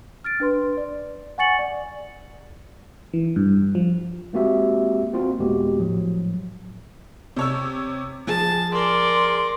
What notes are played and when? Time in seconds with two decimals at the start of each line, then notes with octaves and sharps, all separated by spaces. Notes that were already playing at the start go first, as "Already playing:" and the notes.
0.24 F6 A6 D7
0.40 D4 B4 C6
0.77 D5
1.38 F#5 G#5 C#6 A6 C#7 F#7
1.59 D5
3.13 E3
3.36 G2
3.75 F3
4.33 G#3 A#3 C4 F#4 G4 E5
5.13 A#3 C4 F4 F#4
5.39 D#2 A#2 G#3 B3 F#4 G4
5.80 A2 F3 F#3
7.37 C3 C#5 E6
8.27 F3 G#4 A5
8.72 A#4 D5 C6